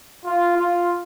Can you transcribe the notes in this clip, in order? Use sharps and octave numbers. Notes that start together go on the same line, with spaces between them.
F4
F4